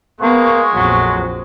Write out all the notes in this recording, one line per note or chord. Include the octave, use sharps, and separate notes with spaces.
G#3 A#3 B3 C#6
A#1 F2 F#3